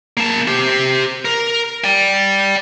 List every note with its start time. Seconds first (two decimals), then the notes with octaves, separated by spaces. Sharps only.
0.17 A#3 A5
0.48 G4 C5
1.25 A#4
1.84 D5 G5